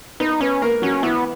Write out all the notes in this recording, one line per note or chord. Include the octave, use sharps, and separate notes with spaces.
B3 D#4 B4
B3 C#4 B4
A#3 A#4
F#3 C#4 F#4
E3 B3 E4